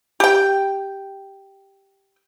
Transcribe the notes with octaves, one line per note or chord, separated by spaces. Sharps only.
G4 G5